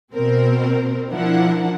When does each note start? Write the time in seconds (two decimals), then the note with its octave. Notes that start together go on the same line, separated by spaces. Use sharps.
0.13 B2 C4 A#4
1.11 F3 D4 E4 A#4 F#5